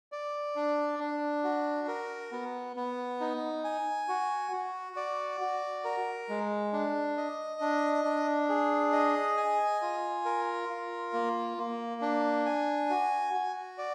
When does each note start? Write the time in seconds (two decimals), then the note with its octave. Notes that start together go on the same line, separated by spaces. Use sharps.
0.12 D5
0.56 D4
0.99 D4
1.44 F#4
1.88 A#4
2.32 B3
2.76 B3
3.20 D#4
3.64 G#5
4.08 F#4
4.52 F#4
4.96 D5
5.41 F#4
5.84 A#4
6.29 G#3
6.73 D4
7.17 D#5
7.61 D4
8.05 D4
8.49 G#4
8.92 D#5
9.37 G#5
9.82 F4
10.25 A#4
10.69 F4
11.14 A#3
11.58 A#3
12.02 D4
12.46 G#5
12.90 F#4
13.34 F#4
13.78 D5